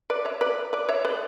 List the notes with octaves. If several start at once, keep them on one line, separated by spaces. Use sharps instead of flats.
B4 D5
C#5 E5
B4 D5
B4 D5
C#5 E5
B4 D5